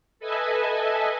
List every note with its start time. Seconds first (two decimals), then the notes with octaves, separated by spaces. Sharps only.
0.19 A4 B4 D#5 E5 G#5 A5